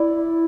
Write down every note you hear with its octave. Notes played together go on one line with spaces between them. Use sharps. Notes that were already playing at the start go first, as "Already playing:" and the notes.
Already playing: E4 D5